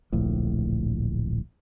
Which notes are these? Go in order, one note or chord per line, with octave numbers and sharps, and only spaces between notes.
D1 A#1 A2